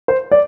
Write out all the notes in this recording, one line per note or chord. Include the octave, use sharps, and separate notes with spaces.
C5
D5